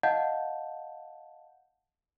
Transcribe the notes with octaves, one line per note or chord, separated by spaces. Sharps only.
D#5 F5 F#5 A5 G6